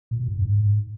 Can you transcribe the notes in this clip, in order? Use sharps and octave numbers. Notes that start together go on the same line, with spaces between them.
A#2
B2
F#2
G2
G#2